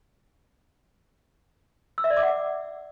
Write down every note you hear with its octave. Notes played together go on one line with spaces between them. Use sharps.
E6
E5
D5
D6
F#5